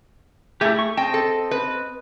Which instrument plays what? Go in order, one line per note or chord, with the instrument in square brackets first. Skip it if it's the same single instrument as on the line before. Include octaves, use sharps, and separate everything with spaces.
[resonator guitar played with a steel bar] A3 G#4 [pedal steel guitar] E4 G4
[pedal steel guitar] C#6
[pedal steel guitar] C4 D#5 A5 [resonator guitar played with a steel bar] G5
[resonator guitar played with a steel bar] A4
B4